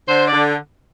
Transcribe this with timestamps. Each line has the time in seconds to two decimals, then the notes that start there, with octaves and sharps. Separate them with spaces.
0.08 D3 C5
0.28 D5
0.33 D3